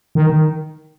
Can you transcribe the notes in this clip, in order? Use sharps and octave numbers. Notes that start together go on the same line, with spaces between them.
D#3
D#3